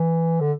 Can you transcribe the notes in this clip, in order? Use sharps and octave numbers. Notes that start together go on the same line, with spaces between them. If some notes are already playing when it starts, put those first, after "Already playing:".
Already playing: E3
D3